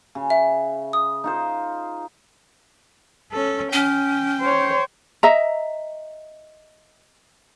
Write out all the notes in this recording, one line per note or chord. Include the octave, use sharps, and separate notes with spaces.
C#3
E5
D#6
D#4 F4 C5
C#4 A4
C#4 G5
C5 C#5
D#5 E5 A#5